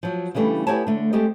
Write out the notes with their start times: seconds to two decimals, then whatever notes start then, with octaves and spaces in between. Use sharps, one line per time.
0.03 F3 F#3
0.34 C#3 E3 G3 A3 D4
0.67 B3 E4 G4 C#5 G#5 A5
0.87 D3 A3
1.13 G#3 A3 C4 G4 D#5